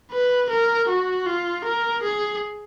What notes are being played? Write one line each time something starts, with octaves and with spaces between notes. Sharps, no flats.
B4
A#4
F#4
F4
A#4
G#4